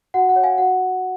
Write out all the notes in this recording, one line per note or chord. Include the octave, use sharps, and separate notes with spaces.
F#4 F#5
F#5
C#5
F5 G#5
F#4 F#5